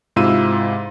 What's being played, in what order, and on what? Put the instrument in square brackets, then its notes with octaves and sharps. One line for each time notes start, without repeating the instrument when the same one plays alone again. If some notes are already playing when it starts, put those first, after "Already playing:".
[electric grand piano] G#2 C3 E4 F4 E6 D#7